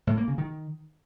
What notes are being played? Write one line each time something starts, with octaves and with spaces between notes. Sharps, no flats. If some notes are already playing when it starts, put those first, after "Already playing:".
A2
A#3
C#3
D#3